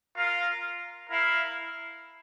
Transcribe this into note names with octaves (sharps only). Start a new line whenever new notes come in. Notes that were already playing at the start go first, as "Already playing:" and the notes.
F4 A#4 F5
E4 A#4 F5